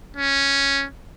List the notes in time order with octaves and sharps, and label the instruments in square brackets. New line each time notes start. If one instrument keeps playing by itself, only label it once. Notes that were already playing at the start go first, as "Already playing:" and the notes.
[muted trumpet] C#4